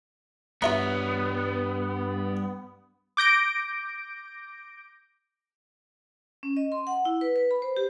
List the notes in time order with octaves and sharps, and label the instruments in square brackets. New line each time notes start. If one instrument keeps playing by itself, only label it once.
[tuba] G2 [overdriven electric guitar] G3 C#5 [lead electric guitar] B3 [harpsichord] F4 E5 A#5
[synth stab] D6 G6 A#6 D7
[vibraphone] C#4
D#5
C6
F#5
E4
B4
B4
B5
C5
G4